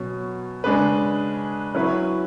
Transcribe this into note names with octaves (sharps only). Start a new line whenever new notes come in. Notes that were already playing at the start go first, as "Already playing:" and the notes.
Already playing: B2 F#3 C#4
C#3 G#3 D4 G#4 B4
F#3 C#4 E4 B4